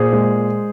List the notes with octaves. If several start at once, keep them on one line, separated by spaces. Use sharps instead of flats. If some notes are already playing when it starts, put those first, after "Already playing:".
Already playing: A#2 G#4 C5
G#3